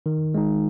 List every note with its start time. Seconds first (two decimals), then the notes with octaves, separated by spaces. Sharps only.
0.06 D#3
0.34 G#3 D#4